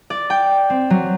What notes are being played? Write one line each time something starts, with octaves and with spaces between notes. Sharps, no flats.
D5
G5
C4
F#3